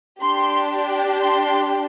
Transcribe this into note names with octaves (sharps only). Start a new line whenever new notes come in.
D4 G4 C6
C6